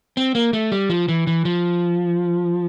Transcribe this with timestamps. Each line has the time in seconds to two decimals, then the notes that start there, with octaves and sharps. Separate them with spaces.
0.17 C4
0.35 A#3
0.53 A3
0.72 G3
0.90 F3
1.08 E3
1.27 E3
1.45 F3